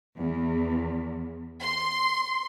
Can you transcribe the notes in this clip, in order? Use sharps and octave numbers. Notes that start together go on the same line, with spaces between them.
E2
C6